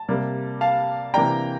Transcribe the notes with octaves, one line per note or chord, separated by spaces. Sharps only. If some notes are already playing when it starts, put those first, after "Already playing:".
Already playing: A5
C3 G3 A#3
F5 A5
C3 E3 A#3 D4 G5 A#5